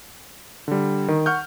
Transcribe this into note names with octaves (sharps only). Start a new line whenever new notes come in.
D3 G3
D#3
F#5 C#6 F6 G6